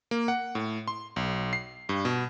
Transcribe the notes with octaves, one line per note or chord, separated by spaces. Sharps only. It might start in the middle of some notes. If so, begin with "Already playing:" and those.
A#3
F#5
A2
C6
B1
C7
G2
B2